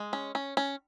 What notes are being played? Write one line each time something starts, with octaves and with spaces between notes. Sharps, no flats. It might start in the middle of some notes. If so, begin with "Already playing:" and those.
Already playing: G#3
C#4
C#4
C#4